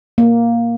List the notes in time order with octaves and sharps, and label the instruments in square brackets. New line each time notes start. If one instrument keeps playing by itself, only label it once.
[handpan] A#3